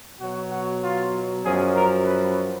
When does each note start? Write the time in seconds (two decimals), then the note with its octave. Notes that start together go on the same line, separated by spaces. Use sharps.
0.20 B2 F#3 F#4
0.51 F#4
0.83 F4
1.44 F#2 F3 G#4
1.76 A#4
2.06 B4